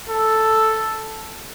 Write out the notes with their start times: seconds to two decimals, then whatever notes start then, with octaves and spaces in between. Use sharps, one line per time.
0.09 A4